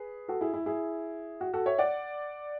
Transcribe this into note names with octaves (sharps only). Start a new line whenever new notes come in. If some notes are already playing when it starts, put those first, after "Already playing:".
Already playing: G#4 B4
F#4 A4
E4 G#4
E4
E4 G#4
F#4
F#4 A4
C#5 E5
D5 F#5